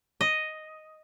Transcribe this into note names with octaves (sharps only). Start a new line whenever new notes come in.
D#5